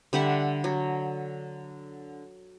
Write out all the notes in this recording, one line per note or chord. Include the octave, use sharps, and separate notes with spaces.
D3 G3 E5 F#5
F#3